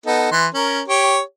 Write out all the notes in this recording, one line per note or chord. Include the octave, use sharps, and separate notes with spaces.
B3 D#4 A4
E3 C6
C#4 A#4
G4 C#5